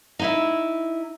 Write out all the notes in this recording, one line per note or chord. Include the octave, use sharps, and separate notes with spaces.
D#4 E4 E5